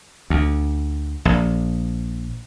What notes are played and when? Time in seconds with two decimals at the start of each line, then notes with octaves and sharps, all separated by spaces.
0.30 D2
1.25 A#1